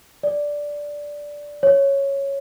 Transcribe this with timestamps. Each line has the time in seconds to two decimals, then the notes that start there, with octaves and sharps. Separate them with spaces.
0.23 D5
1.63 C#5